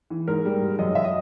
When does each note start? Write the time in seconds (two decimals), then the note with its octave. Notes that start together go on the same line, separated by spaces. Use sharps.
0.10 E3
0.28 G#2 A#4
0.45 G3
0.62 G#2
0.79 F#2 D#5
0.95 F#2 E5
1.04 D#5